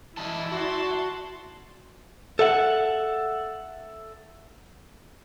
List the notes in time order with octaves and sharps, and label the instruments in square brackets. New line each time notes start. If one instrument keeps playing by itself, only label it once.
[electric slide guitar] E3 D#5 A5 [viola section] E4 D5
[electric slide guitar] F#4 [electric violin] A5 C6
[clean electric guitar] A4 E5 F#5